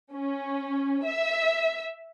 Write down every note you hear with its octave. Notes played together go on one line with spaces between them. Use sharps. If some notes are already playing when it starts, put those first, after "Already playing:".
C#4
E5